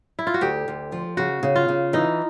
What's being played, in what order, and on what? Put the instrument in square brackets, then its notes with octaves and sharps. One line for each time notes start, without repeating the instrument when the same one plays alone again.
[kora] E4
F4
F#4
[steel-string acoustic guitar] D2 [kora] G4
[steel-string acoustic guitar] D2
F3
[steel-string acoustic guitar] C#3 [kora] F#4
[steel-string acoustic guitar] C#3
[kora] F4
[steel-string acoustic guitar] C#3
[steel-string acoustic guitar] E3 [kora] D#4